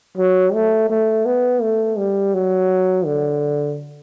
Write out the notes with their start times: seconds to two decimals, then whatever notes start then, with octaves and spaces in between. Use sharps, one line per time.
0.17 F#3
0.54 A3
0.90 A3
1.26 B3
1.62 A3
1.98 G3
2.34 F#3
3.05 D3